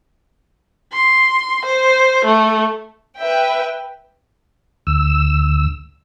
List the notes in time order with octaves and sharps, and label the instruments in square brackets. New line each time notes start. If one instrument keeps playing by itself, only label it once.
[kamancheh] C6
C5
A3
[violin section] B4 E5 G5
[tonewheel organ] D2 E6